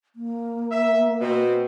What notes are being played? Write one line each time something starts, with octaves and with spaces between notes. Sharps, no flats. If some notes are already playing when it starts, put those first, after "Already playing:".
A#3
E5
B2 C4